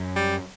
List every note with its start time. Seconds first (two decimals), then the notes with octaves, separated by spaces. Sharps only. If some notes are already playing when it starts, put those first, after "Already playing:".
Already playing: F#2
0.16 G3